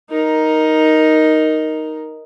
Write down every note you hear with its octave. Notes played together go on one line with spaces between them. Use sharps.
D#4 A#4